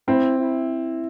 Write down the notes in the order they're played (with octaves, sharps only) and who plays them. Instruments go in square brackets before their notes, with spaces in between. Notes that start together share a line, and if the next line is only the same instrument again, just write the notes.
[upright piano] C4 [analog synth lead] E4
[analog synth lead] E4